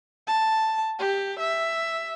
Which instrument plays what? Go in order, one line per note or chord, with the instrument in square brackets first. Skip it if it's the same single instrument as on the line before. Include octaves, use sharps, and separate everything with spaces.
[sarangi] A5
G4
E5